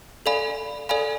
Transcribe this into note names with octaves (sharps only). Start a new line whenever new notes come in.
A4 D5 F5 G#5 B5
A4 D5 F5 G#5 B5